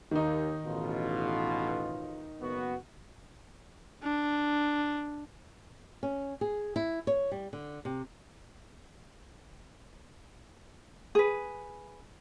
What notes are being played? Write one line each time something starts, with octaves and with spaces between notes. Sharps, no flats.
D#2 D#3 D#4
A1 B2 F4
F#1 B3 F#4
D4
C#4
G#4
E4
C#5
G3
D3
C3
G#4 B4